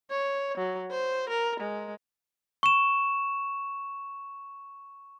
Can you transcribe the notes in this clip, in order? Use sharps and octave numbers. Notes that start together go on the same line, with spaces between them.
C#5
F#3
C5
A#4
G#3
C#6 E7